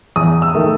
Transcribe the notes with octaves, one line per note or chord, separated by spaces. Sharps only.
E2 D#6
E6
D#3 A3